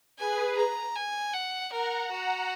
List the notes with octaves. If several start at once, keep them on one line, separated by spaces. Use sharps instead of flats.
G#4 B4 G#5
A#5
G#5
F#5
A#4 F#5 A#5
F#4 F#5 A#5